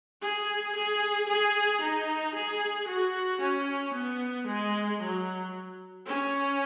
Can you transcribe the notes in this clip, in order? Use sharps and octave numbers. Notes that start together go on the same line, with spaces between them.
G#4
G#4
G#4
D#4
G#4
F#4
C#4
B3
G#3
F#3
C#4